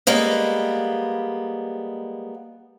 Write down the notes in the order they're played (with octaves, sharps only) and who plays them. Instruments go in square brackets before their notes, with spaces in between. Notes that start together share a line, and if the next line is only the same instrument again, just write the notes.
[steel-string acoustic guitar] G3 G#3 A#3 B3